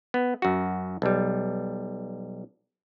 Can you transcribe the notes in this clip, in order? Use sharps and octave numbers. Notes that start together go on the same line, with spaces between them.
B3
F#2 F#4
B1 G3